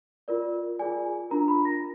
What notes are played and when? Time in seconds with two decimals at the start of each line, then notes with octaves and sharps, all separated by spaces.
0.28 F4 A#4 D5
0.79 F4 G#4 D5 G#5
1.30 D4 F4 A#4 A#5
1.48 B5
1.65 A#6